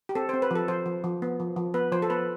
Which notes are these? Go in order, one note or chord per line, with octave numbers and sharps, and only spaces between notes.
G4
C4 A4
C5
C4
B4
F3 A4
F3 C5
F3
F3
B3
F3
F3
B3 B4
F3 C5
A4
B3 B4